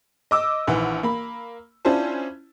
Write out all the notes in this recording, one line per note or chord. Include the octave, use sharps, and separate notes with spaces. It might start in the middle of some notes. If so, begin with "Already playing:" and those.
D#5 D6 E6
A#1 D#3 E3 F#5
A#3 B5
C#4 D4 E4 F4 C5 A5